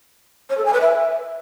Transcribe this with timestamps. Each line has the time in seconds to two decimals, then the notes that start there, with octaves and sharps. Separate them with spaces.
0.50 C#5
0.58 A4
0.65 G#5
0.73 B4
0.81 E5